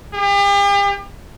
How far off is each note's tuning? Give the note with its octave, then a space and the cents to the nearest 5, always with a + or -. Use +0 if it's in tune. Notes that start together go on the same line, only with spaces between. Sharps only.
G4 +40